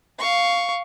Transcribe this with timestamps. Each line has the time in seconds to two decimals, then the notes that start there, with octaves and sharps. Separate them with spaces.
0.18 F5 C#6